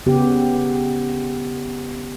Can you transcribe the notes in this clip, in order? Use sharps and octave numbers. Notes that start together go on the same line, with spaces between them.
C#3 B3 G4